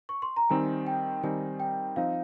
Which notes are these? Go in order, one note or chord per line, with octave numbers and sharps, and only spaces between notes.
C#6
C6
A#5
D#3 G3 C4 D#4 G#5
G5
D#3 G3 C4 D#4 G#5
G5
F3 C4 D#4 F5